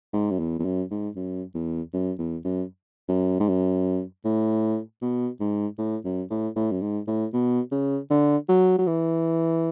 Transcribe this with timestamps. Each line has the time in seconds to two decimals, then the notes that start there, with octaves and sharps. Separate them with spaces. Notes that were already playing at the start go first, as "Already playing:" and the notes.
0.13 G#2
0.30 F#2
0.39 E2
0.59 E2
0.65 F#2
0.91 G#2
1.16 F#2
1.54 E2
1.94 F#2
2.18 E2
2.44 F#2
3.09 F#2
3.40 G#2
3.48 F#2
4.25 A2
5.02 B2
5.40 G#2
5.78 A2
6.05 F#2
6.30 A2
6.56 A2
6.71 F#2
6.81 G#2
7.07 A2
7.33 B2
7.72 C#3
8.10 D3
8.49 F#3
8.78 F#3
8.87 E3